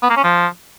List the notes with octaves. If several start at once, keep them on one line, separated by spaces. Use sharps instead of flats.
B3
A#3
C#4
F3